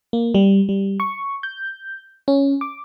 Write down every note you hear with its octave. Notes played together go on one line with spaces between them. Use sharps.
A#3
G3
G3
C#6
G6
C#4
D6